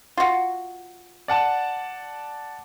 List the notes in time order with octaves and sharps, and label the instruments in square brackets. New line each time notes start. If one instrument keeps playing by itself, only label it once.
[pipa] F4 F#4
[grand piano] D5 F#5 A5